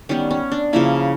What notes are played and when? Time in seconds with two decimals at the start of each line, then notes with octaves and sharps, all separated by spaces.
0.09 D#3 G3 B3 C#4
0.31 C#4
0.52 D4
0.73 C#3 F3 A#3 C#4 E4